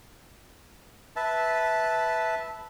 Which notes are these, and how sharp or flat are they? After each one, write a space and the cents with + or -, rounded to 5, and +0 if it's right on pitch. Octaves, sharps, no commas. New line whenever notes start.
B4 +0 E5 -10 A5 -5